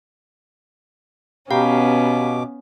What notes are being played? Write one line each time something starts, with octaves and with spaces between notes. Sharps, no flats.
B2 B3 C#4 G4 F5 A#5 B5 D6